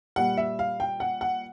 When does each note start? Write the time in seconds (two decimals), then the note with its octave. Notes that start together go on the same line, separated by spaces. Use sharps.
0.16 A#2 G3 F#5
0.37 E5
0.59 F5
0.80 G5
1.00 F#5
1.21 F#5